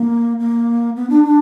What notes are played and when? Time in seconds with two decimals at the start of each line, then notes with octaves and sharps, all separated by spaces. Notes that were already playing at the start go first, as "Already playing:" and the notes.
Already playing: A#3
0.39 A#3
0.96 B3
1.10 D4
1.24 D4